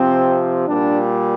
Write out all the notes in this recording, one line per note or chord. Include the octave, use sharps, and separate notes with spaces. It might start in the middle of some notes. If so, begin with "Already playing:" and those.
Already playing: C3 F3 C4
A#2 G3 D4